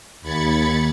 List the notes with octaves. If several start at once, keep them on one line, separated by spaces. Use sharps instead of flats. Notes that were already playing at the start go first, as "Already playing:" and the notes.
D#2 B5 G#6 A6 C#7